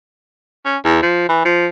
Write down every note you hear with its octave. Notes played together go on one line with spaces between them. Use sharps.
C#4
E2
F3
E3
F3